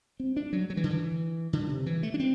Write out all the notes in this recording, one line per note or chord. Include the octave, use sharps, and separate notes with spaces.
C4
D4
F#3
F#3
E3
D3
E3
D3
C3
E3
A3
D4
C4